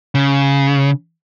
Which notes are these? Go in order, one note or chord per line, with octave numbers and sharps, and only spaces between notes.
C#3